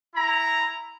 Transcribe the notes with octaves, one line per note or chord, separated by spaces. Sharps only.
E4 A#5